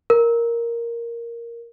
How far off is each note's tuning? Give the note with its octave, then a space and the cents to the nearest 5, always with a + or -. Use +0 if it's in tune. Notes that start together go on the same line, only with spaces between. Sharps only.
A#4 +0